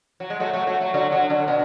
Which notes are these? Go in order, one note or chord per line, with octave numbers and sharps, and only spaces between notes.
F#3
G#3
F#3 A3
F#3 A3
F#3 A3
F#3 A3
D3 F#3
D3 F#3
D3
B2